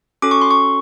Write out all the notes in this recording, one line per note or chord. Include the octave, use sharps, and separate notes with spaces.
C#4 F#4 A4 D6
C#6
C6
C#6